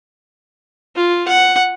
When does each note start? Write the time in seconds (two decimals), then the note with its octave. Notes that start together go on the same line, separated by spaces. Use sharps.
0.96 F4
1.28 F#5